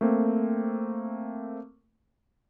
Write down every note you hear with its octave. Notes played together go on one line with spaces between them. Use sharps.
A3 A#3 C4